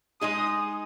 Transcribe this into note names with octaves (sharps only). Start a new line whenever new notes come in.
G#3 D#4 G#4 D#6